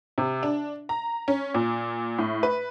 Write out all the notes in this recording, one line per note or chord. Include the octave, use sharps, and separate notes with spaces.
C3
D4
A#5
C#4
A#2
A2
B4